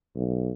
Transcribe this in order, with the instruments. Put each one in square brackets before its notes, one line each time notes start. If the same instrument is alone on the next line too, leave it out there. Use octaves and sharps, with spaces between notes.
[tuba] B1